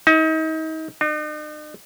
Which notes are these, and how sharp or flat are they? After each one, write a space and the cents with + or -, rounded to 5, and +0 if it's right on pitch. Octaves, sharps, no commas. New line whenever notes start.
D#4 +35
D#4 -45